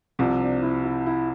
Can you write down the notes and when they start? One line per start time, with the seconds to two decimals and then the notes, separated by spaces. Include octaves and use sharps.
0.19 C2 C3 F3
0.41 D4
0.62 E4
0.84 E4
1.06 E4